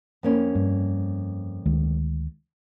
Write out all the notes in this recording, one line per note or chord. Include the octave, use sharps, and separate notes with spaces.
F2 A#3 C#4
G2
D2 D#3 G#3